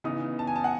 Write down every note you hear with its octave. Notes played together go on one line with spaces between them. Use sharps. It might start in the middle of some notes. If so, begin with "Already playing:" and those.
C#3 E3 B3 D#4 D#6
A5
G#5
A5
F#5